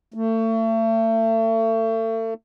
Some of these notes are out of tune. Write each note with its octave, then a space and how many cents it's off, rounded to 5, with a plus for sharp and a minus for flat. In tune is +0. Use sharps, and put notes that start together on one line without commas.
A3 +35